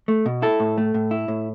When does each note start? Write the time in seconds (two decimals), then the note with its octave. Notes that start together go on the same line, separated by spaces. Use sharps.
0.08 A3
0.26 B2
0.42 E4 A4
0.60 A2
0.78 A3
0.94 A2
1.11 E4
1.28 A2